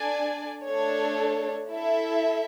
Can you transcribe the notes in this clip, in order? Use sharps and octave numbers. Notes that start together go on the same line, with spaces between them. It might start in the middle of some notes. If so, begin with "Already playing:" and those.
Already playing: D4 A4 D5 G#5
A3 D4 A4 C#5
E4 A4 E5